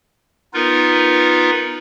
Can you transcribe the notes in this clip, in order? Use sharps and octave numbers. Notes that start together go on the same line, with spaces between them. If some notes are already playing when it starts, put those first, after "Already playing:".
B3 D#4 F4 A#4 B4